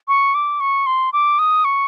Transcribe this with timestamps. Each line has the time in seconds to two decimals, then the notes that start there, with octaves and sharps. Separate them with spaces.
0.08 C#6
0.35 D6
0.60 C#6
0.86 C6
1.13 D6
1.39 D#6
1.65 C#6